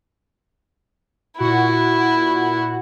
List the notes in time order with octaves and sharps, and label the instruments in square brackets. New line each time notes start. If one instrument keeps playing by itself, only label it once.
[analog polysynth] A#2 F#4 F#5 [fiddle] E4